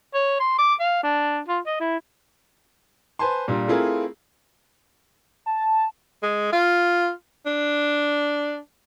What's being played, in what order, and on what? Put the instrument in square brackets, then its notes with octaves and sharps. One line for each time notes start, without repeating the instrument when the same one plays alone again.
[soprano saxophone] C#5
C6
D6
F5
D4
F4
D#5
E4
[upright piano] B4 C5 G#5 A5 C6
A#2 G3 D4
A3 C4 E4 F4 G#4 A#4
[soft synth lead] A5
[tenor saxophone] G#3
F4
D4